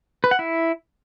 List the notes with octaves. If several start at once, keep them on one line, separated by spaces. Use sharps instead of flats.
B4
F#5
E4